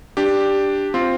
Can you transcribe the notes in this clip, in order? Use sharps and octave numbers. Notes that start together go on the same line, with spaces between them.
D4 G4
C4 F4